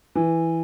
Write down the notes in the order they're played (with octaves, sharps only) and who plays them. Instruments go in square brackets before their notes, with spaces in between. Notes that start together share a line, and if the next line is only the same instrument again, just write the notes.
[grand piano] E3